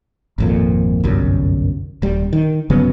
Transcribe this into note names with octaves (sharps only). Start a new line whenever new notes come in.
G#1 F2 A#2
G1 C2 F#2
D#1 G3
D#3
G1 C#3 F#3 B3